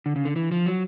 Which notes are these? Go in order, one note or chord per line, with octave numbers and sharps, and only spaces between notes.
D3
C#3
D3
E3
F3
F#3